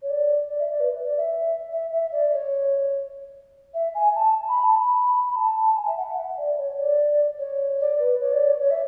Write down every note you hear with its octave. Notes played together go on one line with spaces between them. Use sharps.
C#5
D5
D5
E5
D5
B4
D5
E5
E5
E5
D5
C#5
E5
G#5
A5
B5
A5
B5
B5
A5
A5
G#5
E5
F#5
E5
D5
C#5
D5
C#5
D5
B4
C#5
D5
C#5
C#5
E5